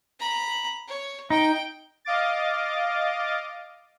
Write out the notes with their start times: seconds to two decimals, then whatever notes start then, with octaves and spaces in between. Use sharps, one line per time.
0.20 A#5 B5
0.88 C#5
1.30 D#4 G5
2.05 D#5 F5 D6 A6